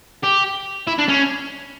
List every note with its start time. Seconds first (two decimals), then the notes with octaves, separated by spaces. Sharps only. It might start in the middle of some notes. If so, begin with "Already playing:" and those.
0.24 G4
0.87 E4
0.98 D4
1.08 C#4